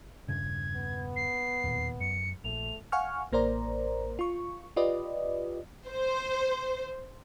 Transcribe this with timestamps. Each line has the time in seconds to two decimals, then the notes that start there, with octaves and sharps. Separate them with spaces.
0.28 E1 G2 C#3 G#6
0.76 B3
1.16 C7
1.64 E1 D#2 A#2
2.00 F#2 C#7
2.44 A#1 A3 F7
2.92 F5 F#5 G#5 C#6 F6
3.32 A1 A#3 A#4 C5 D5 A#5
4.19 F4 C#6
4.76 F4 G4 B4 D5 D#5
5.88 C5